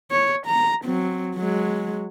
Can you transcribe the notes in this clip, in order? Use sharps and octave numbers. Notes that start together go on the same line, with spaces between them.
C#5
A#5
F#3 C4
F#3 G#3